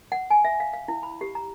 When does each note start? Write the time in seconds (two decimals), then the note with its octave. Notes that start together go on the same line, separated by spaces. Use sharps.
0.12 F#5
0.30 G#5
0.45 E5
0.60 F5
0.73 F5
0.88 E4
1.03 B5
1.21 G4
1.35 A#5